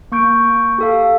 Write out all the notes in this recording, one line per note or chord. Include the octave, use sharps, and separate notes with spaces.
A#3 C#6 G6 D7
G4 A4 F5